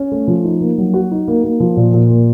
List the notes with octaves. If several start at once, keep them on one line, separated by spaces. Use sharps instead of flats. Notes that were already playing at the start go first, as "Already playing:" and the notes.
Already playing: C#4
A3
F3
D#4
A#3
F#3
F#4
D#4
A#3
A#3
F3
A#2
A#2
A#3